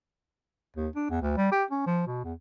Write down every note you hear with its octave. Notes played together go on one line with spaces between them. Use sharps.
D#2
D4
E2
D2
G3
G4
C#4
F3
B2
E2